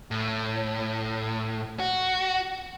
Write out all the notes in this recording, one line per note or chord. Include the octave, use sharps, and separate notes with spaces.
A2
F#4